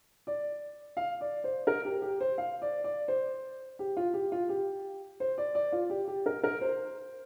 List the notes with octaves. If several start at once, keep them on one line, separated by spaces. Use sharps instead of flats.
D5
F5
D5
C5
A#4
G4
G4
C5
F5
D5
D5
C5
G4
F4
G4
F4
G4
C5
D5
D5
F4
G4
G4
A#4
A#4
C5